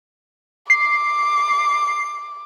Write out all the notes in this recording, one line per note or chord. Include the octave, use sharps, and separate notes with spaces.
D6 C7